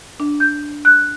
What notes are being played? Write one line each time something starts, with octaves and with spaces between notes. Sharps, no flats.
D4
G6
F#6